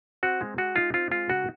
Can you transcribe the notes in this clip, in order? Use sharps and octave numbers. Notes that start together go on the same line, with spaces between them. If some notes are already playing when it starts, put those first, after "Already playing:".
C4 F#4
G#3
G#3 F#4
D#4 F4
C4 F4
G#3 F4
C#3 F#4